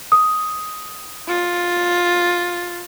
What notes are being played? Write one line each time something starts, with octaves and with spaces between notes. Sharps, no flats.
D#6
F4